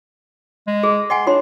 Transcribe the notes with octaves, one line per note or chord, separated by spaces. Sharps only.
G#3
G#4
D#5 F#5 G#5 C6
D4 F4 C#5 C6